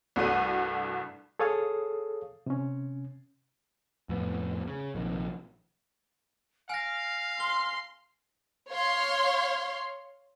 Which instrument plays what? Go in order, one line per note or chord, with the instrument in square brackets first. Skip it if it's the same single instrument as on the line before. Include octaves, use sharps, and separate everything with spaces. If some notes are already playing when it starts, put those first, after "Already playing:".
[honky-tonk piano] C2 G2 A3 F#4 D#7
[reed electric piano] G#4 A4 C#5 F5 D#6
C3 C#4
[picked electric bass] F2 A2 A#3 B3
C#3
A#1 C3 D#3
[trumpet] F5 [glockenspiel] G#5 A#6 [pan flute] F6
[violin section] C6 [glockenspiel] G7
[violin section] C#5 F5 C6